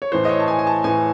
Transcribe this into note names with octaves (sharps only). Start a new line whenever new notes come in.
C#5
A2 E3 C5
D#5
C#5
A5
G#5
G#5
A5
A2 E3 G#5